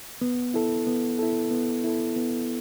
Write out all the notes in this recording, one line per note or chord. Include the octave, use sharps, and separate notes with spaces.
B3
E4 A4
B3
E4 A4
B3
E4 A4
B3